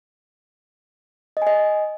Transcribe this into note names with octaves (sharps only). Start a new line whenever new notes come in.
D#5
G#5
D#5